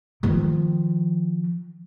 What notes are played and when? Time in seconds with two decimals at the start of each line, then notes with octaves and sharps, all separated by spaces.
0.23 D#3 F3